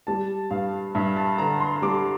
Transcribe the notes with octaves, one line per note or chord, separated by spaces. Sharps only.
G3 A5
G2 F5
G2 E5
A5
D3 A#5
C6
G3 D6